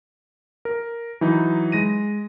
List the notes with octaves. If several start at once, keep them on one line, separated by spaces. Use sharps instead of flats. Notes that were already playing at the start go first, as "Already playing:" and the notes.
A#4
E3 F#3 D#4 D#5
G#3 A#6 D#7